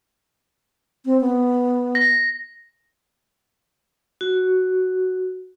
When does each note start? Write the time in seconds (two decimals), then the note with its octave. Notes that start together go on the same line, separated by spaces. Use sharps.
1.05 C4
1.21 B3
1.95 A#6
4.21 F#4